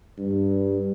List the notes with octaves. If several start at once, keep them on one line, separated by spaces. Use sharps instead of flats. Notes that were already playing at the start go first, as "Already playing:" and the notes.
G2